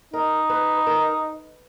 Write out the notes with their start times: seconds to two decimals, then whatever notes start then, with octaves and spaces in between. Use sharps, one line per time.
0.13 D#4 A#4
0.50 B4
0.87 A#4